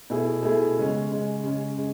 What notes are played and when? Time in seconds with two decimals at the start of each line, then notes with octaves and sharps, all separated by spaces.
0.10 B2 A3 E4 G#4
0.43 B2 A3 E4 G#4
0.77 C#3 G#3 C#4
1.11 C#3 G#3 C#4
1.43 C#3 G#3 C#4
1.78 C#3 G#3 C#4